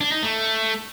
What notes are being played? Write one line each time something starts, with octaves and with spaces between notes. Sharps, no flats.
D4
D#4
A3